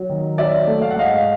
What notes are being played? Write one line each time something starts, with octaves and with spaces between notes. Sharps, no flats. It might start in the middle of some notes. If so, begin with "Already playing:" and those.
Already playing: F#3
D#3
F#3 D5 E5
A3
F5
F#5
G#2 D#5 F5